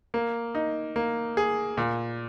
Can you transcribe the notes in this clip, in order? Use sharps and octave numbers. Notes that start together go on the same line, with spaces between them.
A#3
D#4
A#3
G#4
A#2